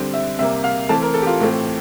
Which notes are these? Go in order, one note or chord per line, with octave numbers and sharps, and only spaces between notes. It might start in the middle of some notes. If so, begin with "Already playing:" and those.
Already playing: D3 G3 C4
E5
C3 G3 A#3 E5
F5
E3 A3 C4 A5
A#4
A4
G4
F4
A2 E3 A3 C4